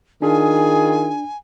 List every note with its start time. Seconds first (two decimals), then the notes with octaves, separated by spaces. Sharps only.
0.22 D#3 D4 F4 G#4 G#5